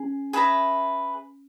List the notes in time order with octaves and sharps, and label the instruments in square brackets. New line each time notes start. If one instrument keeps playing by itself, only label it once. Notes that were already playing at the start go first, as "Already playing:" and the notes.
Already playing: [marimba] C#4 [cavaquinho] G#4
[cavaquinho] G#4 B4 E5 A#5